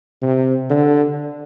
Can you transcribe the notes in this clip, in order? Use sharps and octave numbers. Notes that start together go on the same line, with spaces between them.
C3
D3